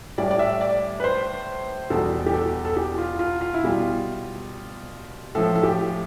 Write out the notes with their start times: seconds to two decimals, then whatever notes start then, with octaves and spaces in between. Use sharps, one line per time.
0.18 A2 G3 D5
0.31 D5
0.39 E5
0.61 D5
1.00 B4
1.04 C5
1.90 E2 B2 G3 A4
2.26 G4
2.33 A4
2.65 A4
2.77 G4
2.98 F4
3.19 F4
3.41 F4
3.54 E4
3.62 B2 G3 F4
5.35 A2 F3 A3 A4
5.55 A4
5.63 G4